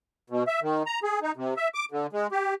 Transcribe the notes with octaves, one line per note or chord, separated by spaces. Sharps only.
B2
E5
D#3
A#5
G#4
D#4
C3
E5
D6
D3
G#3
G4